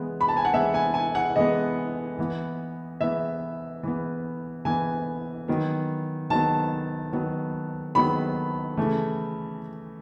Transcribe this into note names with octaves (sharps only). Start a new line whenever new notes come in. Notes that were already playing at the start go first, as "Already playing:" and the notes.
Already playing: E3 G#3 B3
B5
A5
G#5
F#5
E3 G#3 B3 E5
G#5
G#5
F#5
E3 G#3 B3 D#5
E3 B3
E3 B3 E5
E3 B3
E3 B3 G#5
D#3 F#3 B3
D#3 F#3 B3 A5
D#3 F#3 B3
D#3 F#3 B3 B5
C#3 E3 A3